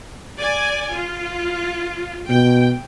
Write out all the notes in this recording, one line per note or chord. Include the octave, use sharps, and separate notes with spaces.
D5 G#5
F4
B2 G5